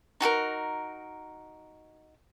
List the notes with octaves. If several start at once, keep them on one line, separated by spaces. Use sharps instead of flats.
D#4 F#4 A4 A#4